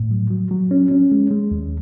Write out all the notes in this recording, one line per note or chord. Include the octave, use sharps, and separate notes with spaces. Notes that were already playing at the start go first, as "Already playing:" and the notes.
Already playing: A2
F#3
F#3
F#3
C#4
C#4
G#3
G#3
D#2